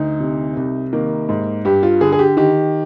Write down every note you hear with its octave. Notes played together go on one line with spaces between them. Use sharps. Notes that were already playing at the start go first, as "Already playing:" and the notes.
Already playing: D2 D#4
C3
C2
D#3 A#3
G#2
G2 G4
F4
D3 G#4
G#4
G4
D#3 G4